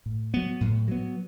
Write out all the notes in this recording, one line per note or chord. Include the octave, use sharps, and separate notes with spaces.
A2
F#3 B3
A2
F#3 B3